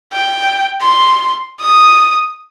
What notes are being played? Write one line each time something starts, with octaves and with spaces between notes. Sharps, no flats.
G5
C6
D#6